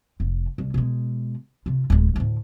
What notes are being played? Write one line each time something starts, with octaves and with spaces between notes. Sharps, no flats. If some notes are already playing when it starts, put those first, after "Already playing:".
F1
C2
B2 G#3
C3 F4
D1 G#3
D2 A2